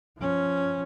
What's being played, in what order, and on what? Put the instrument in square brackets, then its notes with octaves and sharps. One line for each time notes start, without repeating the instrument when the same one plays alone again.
[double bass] F3 C#4